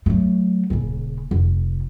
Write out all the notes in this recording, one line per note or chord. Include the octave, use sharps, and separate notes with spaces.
F#3 A3
D#1 C#3
F1